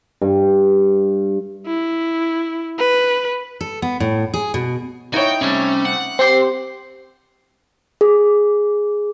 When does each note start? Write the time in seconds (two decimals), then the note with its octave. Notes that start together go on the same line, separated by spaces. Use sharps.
0.22 G2
1.67 E4
2.79 B4
3.61 A4
3.82 B3
4.00 A2
4.34 G#4
4.54 B2
5.14 D#4 E4 F#4 C#5 G5 G#5
5.41 C3 G3 A3 C#4
5.85 F#5
6.19 C4 G4 C5 G5 C6
8.01 G#4